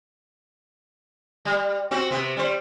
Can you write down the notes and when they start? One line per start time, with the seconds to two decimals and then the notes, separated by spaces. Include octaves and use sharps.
1.45 G3
1.91 C4 F#4
2.11 C3 B3
2.37 G3 C5